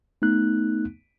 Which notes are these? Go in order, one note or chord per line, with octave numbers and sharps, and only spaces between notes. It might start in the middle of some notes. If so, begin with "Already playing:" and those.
A3 B3 D#4 F#6